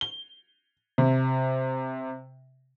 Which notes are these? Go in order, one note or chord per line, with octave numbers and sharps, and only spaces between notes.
G7
C3